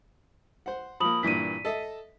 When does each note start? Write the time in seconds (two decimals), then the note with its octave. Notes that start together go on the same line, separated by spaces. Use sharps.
0.66 C5 F#5
1.00 F3 A#3 B5 D#6 F#7
1.23 G2 A#2 E3 B6 D#7
1.65 A4 D#5 E5